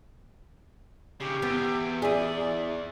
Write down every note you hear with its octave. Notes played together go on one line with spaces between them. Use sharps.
D#2 C#3 G4
E2 B3
E4 G#4 D5